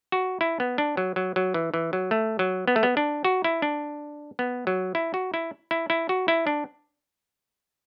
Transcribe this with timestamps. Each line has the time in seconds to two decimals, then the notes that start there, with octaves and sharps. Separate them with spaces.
0.12 F#4
0.41 E4
0.60 B3
0.78 D4
0.97 F#3
1.16 F#3
1.36 F#3
1.54 E3
1.74 E3
1.93 F#3
2.11 A3
2.39 F#3
2.68 B3
2.76 A3
2.83 B3
2.97 D4
3.25 F#4
3.44 E4
3.62 D4
4.39 B3
4.67 F#3
4.95 E4
5.14 F#4
5.34 E4
5.71 E4
5.90 E4
6.09 F#4
6.28 E4
6.47 D4